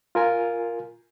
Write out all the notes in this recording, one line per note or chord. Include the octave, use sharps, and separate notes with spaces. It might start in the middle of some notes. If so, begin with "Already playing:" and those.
F4 A#4 G#5